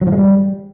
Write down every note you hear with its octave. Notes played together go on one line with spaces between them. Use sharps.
F#3
F3
G#3
G3